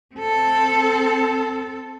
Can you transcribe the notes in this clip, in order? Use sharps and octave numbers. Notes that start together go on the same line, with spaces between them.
C4 A4